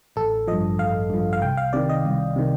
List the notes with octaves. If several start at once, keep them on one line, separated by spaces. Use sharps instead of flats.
A1 A4
G2 F3 D#5
A1 F5
G2 F3
F5
C2 G5
F5
C3 D#3 D5
D#5
C2
C3 D#3